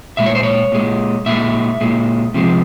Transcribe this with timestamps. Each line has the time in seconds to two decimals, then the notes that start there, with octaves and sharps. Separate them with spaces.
0.17 A#2 G#3 E5
0.26 C#5
0.35 C5
0.43 C#5
0.72 A#2 G#3
1.26 A#2 G#3 E5
1.81 A#2 G#3
2.34 C3 F3 G#3